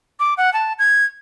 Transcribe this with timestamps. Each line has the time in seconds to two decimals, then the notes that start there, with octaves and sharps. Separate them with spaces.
0.20 D6
0.37 F#5
0.54 A5
0.79 G#6